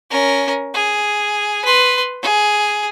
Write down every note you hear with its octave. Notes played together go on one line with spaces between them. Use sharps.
C#4 A#4
G#4
B4 C6
G#4